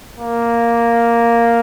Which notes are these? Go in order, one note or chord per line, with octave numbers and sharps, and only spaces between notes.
A#3